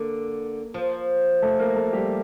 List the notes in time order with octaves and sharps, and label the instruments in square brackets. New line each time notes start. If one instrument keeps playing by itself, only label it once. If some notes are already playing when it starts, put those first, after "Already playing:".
Already playing: [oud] D3 [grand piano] A#3
[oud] F3
[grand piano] A3 A4
A#3 A#4
A3 A4
G3 G4